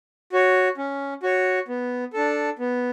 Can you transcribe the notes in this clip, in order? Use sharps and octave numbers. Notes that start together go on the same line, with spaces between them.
F#4 C#5
C#4
F#4 C#5
B3
D4 A4
B3